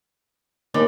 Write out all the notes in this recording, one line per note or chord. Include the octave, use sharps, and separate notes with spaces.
D#2 A#2 D#3 D5